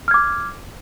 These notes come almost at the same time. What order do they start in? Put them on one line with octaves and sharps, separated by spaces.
F6 G#6 D6